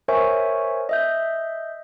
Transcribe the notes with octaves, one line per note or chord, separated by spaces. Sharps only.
A#4 C5 C#5 E5 G#5 C#6
D#5 E5 G6